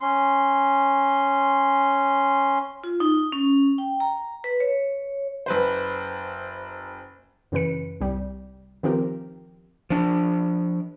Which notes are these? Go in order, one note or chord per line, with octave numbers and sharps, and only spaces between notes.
C#4 C6
F4
D#4
C#4
G5
A#5
B4
C#5
F#1 B4 C5
F#2 C#3 E3 B4 C#7
C2 G3
D#3 F3 C4 G4 A#4
F3 D4